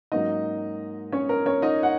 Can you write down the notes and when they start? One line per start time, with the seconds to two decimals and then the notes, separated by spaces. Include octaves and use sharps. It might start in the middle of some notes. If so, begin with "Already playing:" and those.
0.12 G#2 F#3 A#3 C#4 D#4 D#5
1.12 C#4 C#5
1.29 A#4
1.46 C#4 C#5
1.62 D#4 D#5
1.83 F#5